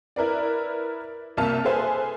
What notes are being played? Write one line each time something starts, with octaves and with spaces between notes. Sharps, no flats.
E4 A#4 B4 D5
C2 A#3 E5 A5 F6
G#4 A4 B4 C5 E5 G#5